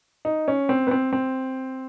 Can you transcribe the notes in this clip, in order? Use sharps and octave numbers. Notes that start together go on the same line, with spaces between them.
D#4
C#4
C4
B3
C4
C4